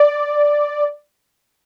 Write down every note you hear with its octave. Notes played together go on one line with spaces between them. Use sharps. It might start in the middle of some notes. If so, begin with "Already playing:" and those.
Already playing: D5